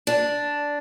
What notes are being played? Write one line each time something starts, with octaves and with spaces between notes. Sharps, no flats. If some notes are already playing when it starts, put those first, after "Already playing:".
D4